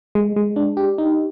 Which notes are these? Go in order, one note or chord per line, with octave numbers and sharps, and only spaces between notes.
G#3
G#3
D4
G4
D#4